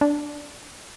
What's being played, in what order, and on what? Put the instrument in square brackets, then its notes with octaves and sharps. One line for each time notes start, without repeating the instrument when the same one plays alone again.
[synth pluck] D4